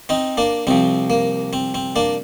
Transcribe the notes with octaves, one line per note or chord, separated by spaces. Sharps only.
C4 D#4
A#3 D4
C2 C3 F3 C4
A#3
C4
C4
A#3 D4